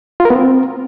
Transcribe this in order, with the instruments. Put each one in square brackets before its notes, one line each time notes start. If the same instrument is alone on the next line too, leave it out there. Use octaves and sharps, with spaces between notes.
[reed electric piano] F4
A#4
B3
C4